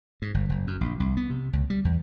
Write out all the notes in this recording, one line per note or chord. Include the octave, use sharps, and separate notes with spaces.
G#2
G1
F#1
F#2
A#1
C2
B3
C3
C#2
G3
E2